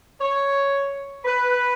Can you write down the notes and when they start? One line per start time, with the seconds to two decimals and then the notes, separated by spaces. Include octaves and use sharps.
0.20 C#5
1.25 B4